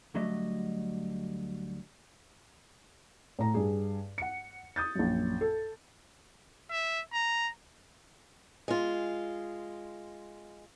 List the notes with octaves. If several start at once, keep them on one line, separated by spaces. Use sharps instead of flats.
D2 D3 F#3 G3 A3 D#5
A2 A#5
G2 G#4
F#5 C#7
D#6 G6 A6
A#1 F#2
A4
E5
A#5
G#3 F4